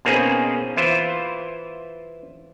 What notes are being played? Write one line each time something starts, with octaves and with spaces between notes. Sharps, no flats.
B2 A#3 C4 C#4 D#4 G#4
E3 E4 F4 C5